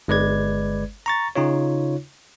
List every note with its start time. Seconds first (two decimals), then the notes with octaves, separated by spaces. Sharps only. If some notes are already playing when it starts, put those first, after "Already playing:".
0.08 G1 G#3 B4 D5 G#6
1.06 A#5 C#6 A6
1.36 C#3 D#4 F4 C#5